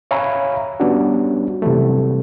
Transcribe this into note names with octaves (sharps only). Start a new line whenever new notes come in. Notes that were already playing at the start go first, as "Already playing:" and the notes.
C#5 E5 F5 G#5 A#5 B5
G3 B3 C#4 D4 F#4
C3 E3 F#3 G3 A3